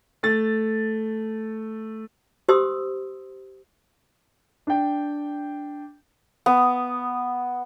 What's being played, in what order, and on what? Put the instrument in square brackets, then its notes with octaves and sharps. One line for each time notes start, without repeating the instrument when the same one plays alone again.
[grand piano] A3 A6
[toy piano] G4 C5 C6 D#6 E6
[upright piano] D4 G5
[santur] B3